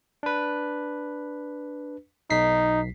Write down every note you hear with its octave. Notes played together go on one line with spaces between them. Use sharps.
D4 B4
B1 D#4 B6 C7